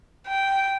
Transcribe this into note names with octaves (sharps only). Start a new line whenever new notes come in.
G5